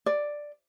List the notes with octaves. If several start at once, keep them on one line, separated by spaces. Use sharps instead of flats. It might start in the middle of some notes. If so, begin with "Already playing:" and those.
D5